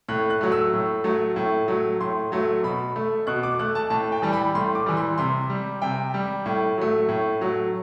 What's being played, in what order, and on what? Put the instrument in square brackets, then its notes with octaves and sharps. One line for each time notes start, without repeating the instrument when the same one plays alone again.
[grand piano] A2 F#6
F#6
F#3 A3
E6
A2
F#3 A3
A2
F#3 A3
A2 C6
F#3 A3
B2 B5
A3
B2 F#6
D6
A3 F#6
A5
A2 A5
G5
E3 G3
B5
A2 C6
D6
E3 G3
C6
C3 C6
G3
C3 G5
G3
A2
F#3 A3
A2
F#3 A3